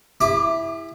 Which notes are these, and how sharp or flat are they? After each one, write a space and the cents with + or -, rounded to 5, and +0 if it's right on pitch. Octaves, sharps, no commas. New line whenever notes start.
E4 -5 G4 +45 D6 +0